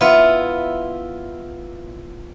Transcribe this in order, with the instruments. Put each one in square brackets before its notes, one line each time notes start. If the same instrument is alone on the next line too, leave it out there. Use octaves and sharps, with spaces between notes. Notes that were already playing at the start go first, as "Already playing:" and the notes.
[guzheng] B3 F4 [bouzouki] E4